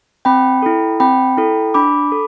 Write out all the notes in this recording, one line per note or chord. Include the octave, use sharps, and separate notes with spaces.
C4 G5 B5
E4 A4
C4 G5 B5
E4 A4
D4 B5 D6
A4